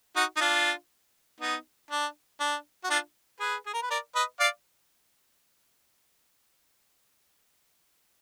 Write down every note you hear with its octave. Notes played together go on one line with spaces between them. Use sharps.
D#4 F#4
D#4
D4 F4
B3 D#4
D4
D4
F#4
D4 F4
G#4 B4
G#4
A#4
B4
A#4 D5
B4 D#5
D5 F5